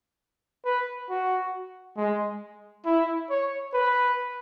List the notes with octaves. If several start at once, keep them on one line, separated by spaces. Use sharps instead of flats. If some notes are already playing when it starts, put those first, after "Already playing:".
B4
F#4
G#3
E4
C#5
B4